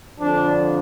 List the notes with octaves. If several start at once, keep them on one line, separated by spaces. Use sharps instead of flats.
F2 D3 F3 D4